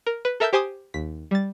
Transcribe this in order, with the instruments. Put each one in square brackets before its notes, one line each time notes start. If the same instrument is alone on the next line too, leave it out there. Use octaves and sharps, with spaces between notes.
[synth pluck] A#4
B4
A4 A#4 E5 A5 E6 G6
G4 C5 G#5 C6 D6 D#6
D#2 B6
G3 A6